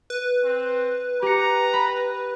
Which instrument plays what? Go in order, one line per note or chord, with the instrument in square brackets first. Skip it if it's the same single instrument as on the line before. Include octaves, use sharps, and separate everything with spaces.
[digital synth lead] B4
[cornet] C4
[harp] G4 C#7 [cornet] A#5
[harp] B5